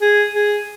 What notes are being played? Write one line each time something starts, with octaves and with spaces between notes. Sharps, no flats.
G#4
G#4